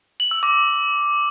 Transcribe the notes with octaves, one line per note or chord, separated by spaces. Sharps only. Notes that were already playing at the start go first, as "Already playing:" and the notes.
F#7
E6
D6